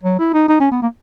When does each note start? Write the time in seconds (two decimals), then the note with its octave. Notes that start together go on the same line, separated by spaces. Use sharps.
0.03 F#3
0.19 E4
0.34 D#4
0.48 D#4
0.60 C#4
0.71 B3
0.82 A#3